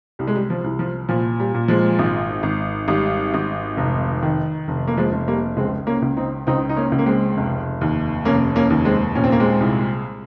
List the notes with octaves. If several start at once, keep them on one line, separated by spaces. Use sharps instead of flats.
C2 G3
G#3
G3
F3
C2
F3
A#2 F3
G3
A#2
F3 G#3
G#1
G#1
G#1 G3
G#1
F1
D#3
F1
A#3
F3 G#3
F1
G3 A#3
C#2 G#3 C4
A#3 C#4
C#2
C4 D#4
C#2 C4 D#4
D#4
A#3 C#4
C#2
A#3
G#3 C4
F1
D#2
F1 A#3 C#4
A#3 C#4
D#2
G#3 C4
A#2 C#4
C4
A#3
G#3 C4
C2